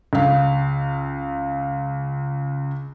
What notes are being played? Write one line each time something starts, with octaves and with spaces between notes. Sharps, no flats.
C#2 F5